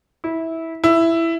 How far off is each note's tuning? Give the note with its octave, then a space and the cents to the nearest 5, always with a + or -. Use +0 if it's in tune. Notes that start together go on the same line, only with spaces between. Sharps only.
E4 -15
E4 +10